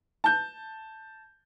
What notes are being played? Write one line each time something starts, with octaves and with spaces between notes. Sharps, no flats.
A5 G6